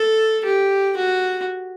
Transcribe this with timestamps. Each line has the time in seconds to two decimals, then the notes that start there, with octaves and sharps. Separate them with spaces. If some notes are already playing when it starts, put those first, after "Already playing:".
Already playing: A4
0.44 G4
0.96 F#4